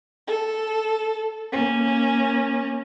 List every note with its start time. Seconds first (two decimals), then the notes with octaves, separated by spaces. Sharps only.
0.28 A4
1.52 A#3 C#4